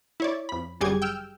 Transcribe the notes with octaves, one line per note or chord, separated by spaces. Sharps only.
E4 C#5 D5
F2 B5
G1 F#2 G3 G4 G#4 G#6
G5 E6 F6